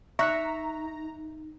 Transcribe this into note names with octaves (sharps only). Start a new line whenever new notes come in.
D#4 E5 A#5 C#6 F#6 C#7